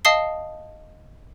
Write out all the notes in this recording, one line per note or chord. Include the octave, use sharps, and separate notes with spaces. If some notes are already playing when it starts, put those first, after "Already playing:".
D#5 F5 A5 D#6 C7 G7